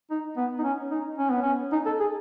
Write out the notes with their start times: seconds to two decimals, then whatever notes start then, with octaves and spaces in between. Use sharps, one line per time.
0.11 D#4
0.37 B3
0.59 D#4
0.64 C#4
0.91 D#4
1.18 C#4
1.30 B3
1.42 C#4
1.72 D#4
1.86 A4
2.00 G#4